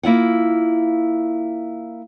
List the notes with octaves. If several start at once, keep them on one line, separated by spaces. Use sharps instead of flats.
A#3 E4 F4 F#5